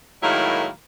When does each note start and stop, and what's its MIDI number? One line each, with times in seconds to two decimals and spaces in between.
0.22 0.67 45
0.22 0.67 51
0.22 0.67 54
0.22 0.67 56
0.22 0.67 58
0.22 0.67 64